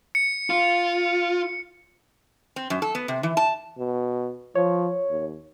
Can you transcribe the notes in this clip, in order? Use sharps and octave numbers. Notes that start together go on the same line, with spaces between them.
C#7
F4
C4
F#2
A4
B3
C3
E3
A5
B2
F3 C#5
D#2